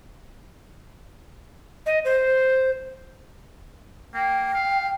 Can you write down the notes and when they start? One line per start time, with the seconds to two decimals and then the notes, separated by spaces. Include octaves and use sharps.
1.86 D#5
2.05 C5
4.14 A#3 G5
4.54 F5